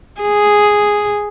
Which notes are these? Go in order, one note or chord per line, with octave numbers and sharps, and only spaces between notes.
G#4